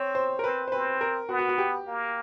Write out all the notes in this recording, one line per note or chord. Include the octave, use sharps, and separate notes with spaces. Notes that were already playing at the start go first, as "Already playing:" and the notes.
Already playing: C4 C#5
C5
A#4
C4 B4
C5
C4 B4
A#4
B3 F#4
F#4
F#4
G4
A#3